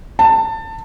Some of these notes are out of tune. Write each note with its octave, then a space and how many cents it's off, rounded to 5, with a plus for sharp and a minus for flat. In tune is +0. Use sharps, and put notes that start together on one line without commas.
A5 +20